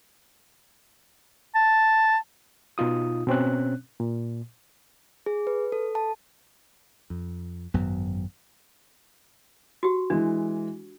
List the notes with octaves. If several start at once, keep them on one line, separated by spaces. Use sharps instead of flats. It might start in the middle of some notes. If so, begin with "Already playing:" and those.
A5
B2 D#4 F4 D#6
B2 C4 C#4 F#6
A#2
G#4
B4
A4
A5
F2
G#1 F#2 F#3 B3
F#4 G4
E3 G#3 D4